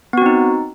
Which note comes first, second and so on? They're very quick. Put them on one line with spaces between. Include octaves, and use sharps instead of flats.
B3 F#4 C4 D#4